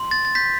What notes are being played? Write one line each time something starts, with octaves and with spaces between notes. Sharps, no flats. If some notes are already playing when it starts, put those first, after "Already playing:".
Already playing: C6
A6
A6
G6 B6